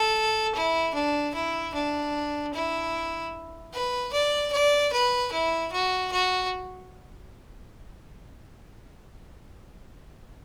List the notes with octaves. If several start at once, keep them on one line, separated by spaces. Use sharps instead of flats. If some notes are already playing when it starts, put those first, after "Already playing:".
Already playing: A4
E4
D4
E4
D4
E4
B4
D5
D5
B4
E4
F#4
F#4